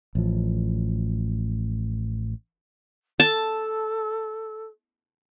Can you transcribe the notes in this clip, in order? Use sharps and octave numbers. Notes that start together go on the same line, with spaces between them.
A1 F3
A4 A5